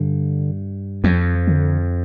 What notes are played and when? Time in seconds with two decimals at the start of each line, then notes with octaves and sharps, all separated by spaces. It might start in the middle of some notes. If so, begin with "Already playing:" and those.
Already playing: G2 D3
1.04 F2 F3
1.47 D3